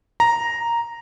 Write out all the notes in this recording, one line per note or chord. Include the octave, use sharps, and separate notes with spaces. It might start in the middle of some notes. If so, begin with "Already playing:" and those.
A#5